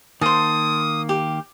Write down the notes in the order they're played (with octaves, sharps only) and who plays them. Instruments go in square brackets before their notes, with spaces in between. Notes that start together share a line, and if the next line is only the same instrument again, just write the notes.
[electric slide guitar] D#3 A#3 [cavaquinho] C5 A5 [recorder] D#6
[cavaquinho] G4